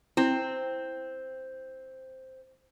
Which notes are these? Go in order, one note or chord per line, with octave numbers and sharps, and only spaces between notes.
C4 E4 C5